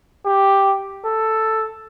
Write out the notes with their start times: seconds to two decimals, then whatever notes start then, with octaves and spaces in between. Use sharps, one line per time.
0.25 G4
1.04 A4